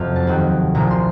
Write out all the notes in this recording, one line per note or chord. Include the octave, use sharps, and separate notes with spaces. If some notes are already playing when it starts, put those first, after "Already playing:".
Already playing: F2 C3 F#3 F5
A5
D#2 D#3 F#3
C2 A#2 F3 A#5
C6